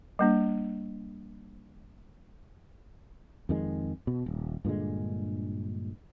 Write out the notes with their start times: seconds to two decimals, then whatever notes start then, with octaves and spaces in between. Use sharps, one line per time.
0.19 G3 A#3 D4
3.49 F2 D#3 G#3
4.07 B2
4.26 D#1
4.65 G2 A#2 D3 G#3